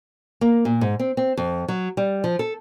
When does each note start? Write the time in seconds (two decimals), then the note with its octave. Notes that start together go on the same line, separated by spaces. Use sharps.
0.41 A#3
0.65 A#2
0.81 G#2
0.99 C4
1.17 C4
1.37 F2
1.68 F#3
1.97 G3
2.24 F3
2.39 A4